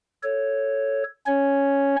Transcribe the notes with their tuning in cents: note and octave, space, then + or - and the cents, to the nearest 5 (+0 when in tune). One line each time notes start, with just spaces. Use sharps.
A4 +0 C#5 +0
C#4 +0 C#5 +0